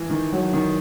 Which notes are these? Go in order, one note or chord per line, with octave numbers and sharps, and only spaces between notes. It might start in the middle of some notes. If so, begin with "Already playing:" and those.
Already playing: E3
D#3
F#3
D#3